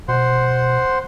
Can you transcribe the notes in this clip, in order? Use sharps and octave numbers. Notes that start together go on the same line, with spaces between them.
B2 C5 F#5 C6